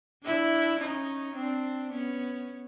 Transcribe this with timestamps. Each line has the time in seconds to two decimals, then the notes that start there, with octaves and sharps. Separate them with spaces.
0.24 D4 E4
0.80 C#4 D#4
1.36 C4 D4
1.92 B3 C#4